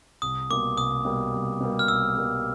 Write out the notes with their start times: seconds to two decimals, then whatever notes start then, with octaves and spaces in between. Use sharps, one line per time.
0.22 C2 D#6
0.50 B2 G3 A#3 D6
0.77 C2 D#6
1.05 B2 G3 A#3
1.33 C2
1.61 B2 G3 A#3
1.79 F6
1.88 C2 E6
2.17 B2 G3 A#3